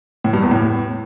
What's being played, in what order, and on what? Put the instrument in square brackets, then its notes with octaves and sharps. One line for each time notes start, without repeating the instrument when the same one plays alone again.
[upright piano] A2
G2
E2
A2